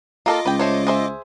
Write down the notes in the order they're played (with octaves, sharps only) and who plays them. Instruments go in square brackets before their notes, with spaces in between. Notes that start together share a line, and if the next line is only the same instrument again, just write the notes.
[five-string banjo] A#3 A4 A#4 [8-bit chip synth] F4 D#5 D6
[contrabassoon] C#2 [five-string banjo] B4 G5
[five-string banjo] A3 C5 C#5
G#4 C5 E5